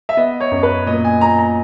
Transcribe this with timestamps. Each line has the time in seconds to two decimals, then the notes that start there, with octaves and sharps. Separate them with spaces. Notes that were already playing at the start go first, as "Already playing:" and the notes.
0.09 E5
0.17 B3 D#5
0.40 C#5
0.51 F#2
0.63 B4
0.86 A#2 D#5
1.04 G#5
1.21 A#2 A#5
1.38 A#5